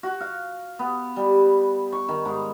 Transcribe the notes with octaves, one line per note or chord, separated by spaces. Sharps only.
F#4
F5
B3
G3
C#6
D#3
G#2